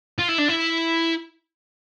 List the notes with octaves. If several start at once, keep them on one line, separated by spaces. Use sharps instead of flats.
F4
E4
D4
E4